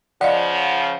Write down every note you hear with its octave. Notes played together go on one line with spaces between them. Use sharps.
C#3 F3 D5 D#5 F5 F#5